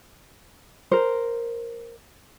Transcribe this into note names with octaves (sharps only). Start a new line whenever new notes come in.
A#4 C5